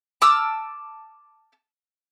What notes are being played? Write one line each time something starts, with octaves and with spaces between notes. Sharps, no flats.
A5 D6 E6 F6